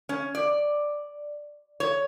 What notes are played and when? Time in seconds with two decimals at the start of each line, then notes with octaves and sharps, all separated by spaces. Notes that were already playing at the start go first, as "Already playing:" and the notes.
0.09 C#4
0.35 D5
1.80 C#5